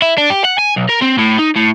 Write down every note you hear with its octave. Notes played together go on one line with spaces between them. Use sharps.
E4
D4
G4
F#5
G#5
B1
A#4
C4
A2
D#4
A2